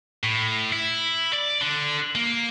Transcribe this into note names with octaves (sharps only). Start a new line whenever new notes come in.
A2
E4
D5
D3
A#3